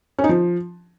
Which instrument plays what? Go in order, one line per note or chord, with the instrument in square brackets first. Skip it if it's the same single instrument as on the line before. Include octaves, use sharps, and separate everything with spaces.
[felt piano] C#4
D#4
F3